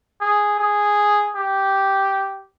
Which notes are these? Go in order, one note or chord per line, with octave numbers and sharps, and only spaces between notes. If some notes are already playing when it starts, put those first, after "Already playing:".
G#4
G#4
G4